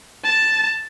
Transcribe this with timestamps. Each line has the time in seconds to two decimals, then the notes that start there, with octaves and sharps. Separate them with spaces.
0.24 A5